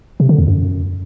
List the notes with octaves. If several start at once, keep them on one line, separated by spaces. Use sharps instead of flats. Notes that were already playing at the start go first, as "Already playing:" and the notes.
C3
D3
E2
F#2